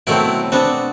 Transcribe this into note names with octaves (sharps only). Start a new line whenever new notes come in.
B2 D#3 F#3 A3 C4 E4
B3 C4 D4 F#4